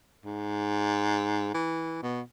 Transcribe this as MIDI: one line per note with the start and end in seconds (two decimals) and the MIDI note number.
0.25 1.54 44
1.54 1.99 52
2.02 2.22 47